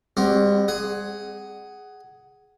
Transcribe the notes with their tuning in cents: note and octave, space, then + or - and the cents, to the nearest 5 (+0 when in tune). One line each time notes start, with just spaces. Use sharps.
G3 +40 C4 +0 F#4 +30
G#4 +0 F#5 +15